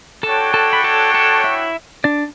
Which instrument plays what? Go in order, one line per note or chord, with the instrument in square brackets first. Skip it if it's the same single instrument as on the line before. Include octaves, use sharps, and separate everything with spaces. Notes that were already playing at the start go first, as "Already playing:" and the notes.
[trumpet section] D4 F#4 C#5 G5 [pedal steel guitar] A4 A5
[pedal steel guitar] A4 A5
B5
A4 A5
A4 A5
E4 E5
D4 D5